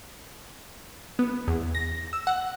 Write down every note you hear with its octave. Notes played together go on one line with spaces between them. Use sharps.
B3
E2
A#6
E6
F#5